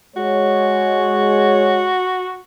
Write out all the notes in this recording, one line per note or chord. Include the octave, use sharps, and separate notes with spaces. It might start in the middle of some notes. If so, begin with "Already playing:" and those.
G#3 F#4 C#5